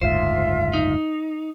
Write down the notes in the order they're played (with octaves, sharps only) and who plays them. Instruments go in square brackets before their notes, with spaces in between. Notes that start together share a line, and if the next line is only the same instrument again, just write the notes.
[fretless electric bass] F#1 D2 G#2 [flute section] F4 E5 [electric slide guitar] C5
[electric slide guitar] D#4